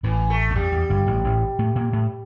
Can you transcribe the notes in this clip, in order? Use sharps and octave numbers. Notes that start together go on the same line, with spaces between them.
A1 A2 E3
A3
G2
F2 G3
E2
G1 G2
A1 A2
A1 A2
A2 A3
A#2 A#3
A2 A3